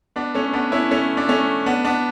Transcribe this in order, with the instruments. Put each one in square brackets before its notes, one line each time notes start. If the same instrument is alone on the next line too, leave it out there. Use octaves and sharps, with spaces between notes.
[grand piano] B3 D4
A3 C#4
B3 D4
C#4 E4
A3 C#4
D4
A3 C#4
B3 D4
B3 D4